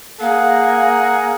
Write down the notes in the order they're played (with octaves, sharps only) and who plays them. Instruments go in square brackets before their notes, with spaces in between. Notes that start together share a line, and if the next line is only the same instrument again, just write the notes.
[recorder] A#3 [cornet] G#4 [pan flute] F5 [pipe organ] F#5